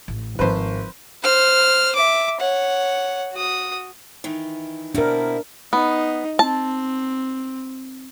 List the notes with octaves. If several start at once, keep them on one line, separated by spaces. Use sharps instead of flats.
A1
G#1 F3 F4 B4 C5
C5 F6
E5 D6
C#5 F#5
F#4 D#6
D#3 E3
B2 C4 D4 E4 A#4
B3 D#4
C4 A5